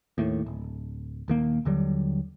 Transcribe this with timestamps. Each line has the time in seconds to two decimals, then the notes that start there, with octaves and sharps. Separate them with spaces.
0.18 D#2 A2
0.46 D1
1.28 D#1 D#3 A#3
1.65 D#2 D3 F#3 G3